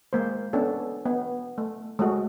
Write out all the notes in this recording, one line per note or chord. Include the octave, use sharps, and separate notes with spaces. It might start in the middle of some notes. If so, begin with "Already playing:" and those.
G#3 A#3 C5
B3 C#4 D4 A4
B3
A3
G#3 A3 F#4